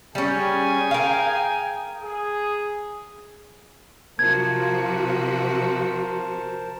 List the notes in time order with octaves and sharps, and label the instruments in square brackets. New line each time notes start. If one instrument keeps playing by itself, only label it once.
[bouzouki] G3 C#4 [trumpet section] G#4 G5 G#5
[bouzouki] A#4 F5
[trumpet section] G#4
[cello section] C3 F3 F#4 [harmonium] A#4 C5 A5 [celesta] G#6